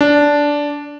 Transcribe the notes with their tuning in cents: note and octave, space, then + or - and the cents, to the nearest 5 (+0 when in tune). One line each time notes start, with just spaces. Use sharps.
D4 -10